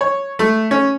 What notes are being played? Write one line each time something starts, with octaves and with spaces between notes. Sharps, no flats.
C#5
A3
C#4